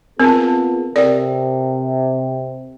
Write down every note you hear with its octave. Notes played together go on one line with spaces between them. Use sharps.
B3 C4 F4 G#4 A#4 A5
C3 A4 A#4 D5 G5